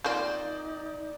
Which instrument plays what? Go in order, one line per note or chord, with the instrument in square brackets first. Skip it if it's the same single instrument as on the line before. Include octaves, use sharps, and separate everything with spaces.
[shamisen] F3 A#3 C4 [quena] D#4 [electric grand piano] D5 G6